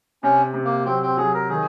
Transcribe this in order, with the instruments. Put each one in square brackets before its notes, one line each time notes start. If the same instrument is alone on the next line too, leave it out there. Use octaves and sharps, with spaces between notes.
[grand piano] C3 [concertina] C#4
[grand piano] C3
[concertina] A#3
[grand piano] F#3 [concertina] C4
[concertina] C4
[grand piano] F#3 [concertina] G#4
[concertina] A#4
[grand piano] D#3 [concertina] G#4